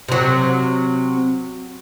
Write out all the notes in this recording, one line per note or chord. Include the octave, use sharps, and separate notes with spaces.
C3 F#3